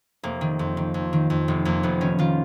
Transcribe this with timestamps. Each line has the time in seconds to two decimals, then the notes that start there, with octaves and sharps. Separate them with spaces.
0.23 F1 A#3
0.41 D#3
0.59 F2
0.77 D#3
0.94 F2
1.13 D#3
1.30 F2
1.48 F1
1.65 F2 A#3
1.83 F1 B3
2.01 D#3 C#4
2.19 D#3 F4